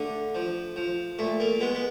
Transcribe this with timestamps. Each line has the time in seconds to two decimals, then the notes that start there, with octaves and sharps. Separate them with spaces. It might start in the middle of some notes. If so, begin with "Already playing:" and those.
Already playing: D3 A3
0.35 F3
0.76 F3
1.19 A#2 A3
1.40 A#3
1.61 G#3 B3
1.75 B3